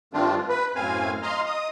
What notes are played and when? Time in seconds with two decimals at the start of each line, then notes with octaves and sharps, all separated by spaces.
0.14 G2 D#3 A3 C4 D4 F4
0.49 B4
0.75 F#2 A2 C4 F5 G#5
1.23 D#5 F5 A#5 C6
1.46 D#5 D#6